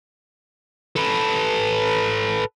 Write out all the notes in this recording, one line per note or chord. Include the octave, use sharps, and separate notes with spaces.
A4 B4